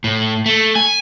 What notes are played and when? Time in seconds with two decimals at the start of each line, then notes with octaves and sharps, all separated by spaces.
0.04 A2
0.46 A3
0.75 G#5